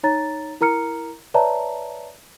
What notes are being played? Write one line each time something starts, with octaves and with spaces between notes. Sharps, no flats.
D#4 C#5 A#5 A6
E4 A#4 A#5 F6 C#7
B4 C#5 D5 E5 A5 A#5